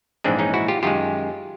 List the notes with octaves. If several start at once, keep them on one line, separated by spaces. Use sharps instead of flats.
A#1 G#2 E3 G#3 C4 D4
C#4 D#4
E4 F#4
F4 G4
F#2 D#3 G#3 F4 G4